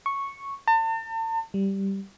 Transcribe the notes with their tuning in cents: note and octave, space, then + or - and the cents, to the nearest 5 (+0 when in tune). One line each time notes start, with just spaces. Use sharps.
C#6 -5
A5 +40
G3 -5